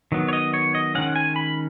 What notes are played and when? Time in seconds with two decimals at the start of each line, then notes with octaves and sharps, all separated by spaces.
0.12 D#3 F#3 B3
0.28 C#5
0.33 D#5
0.54 C#5
0.75 D#5
0.95 D#3 G#3 C#4 F#5
1.16 G#5
1.36 B5